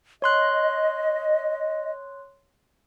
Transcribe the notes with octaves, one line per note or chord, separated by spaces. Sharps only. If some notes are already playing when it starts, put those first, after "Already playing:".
C#5 D#5 C6 F#6